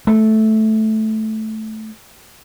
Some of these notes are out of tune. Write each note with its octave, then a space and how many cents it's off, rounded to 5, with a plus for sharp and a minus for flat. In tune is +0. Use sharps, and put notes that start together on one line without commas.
A3 -10